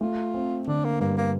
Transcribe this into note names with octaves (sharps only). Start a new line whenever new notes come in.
A3 F4
C4
D3 D4
A#3
G2 A#3
A#3